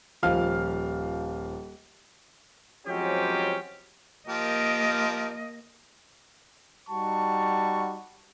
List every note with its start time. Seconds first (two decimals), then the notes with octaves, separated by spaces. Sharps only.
0.23 D#1 F3 F5 F6
2.87 F3 F#3 G#3 C4 C#4 G4
4.28 F3 A#3 G4 A#4 D#5
6.89 G3 D#4 F#4 A5 C#6